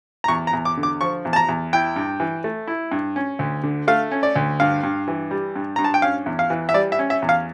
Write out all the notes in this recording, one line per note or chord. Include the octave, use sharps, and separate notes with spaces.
A#5
E2 C#6
A#5
E2
D6
D3
D6
F3 C#6
E2
A5
A#5
E2
E4 G5
G2
E3
A3
E4
G2
C#4
D2
D3
A3 F5
C#4
D5
D2
G2 F5
G2
E3
G3
G2
G2 A#5
A5
G5
C#4 F5
E2
F5
E3
E5
G3 D5
E5
C#4
E5
E2
F5